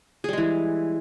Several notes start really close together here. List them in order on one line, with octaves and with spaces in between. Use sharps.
G#4 G3 G#3 E3